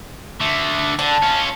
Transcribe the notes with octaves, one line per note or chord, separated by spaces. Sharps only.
D3 A3
D3 A5
C#4 F4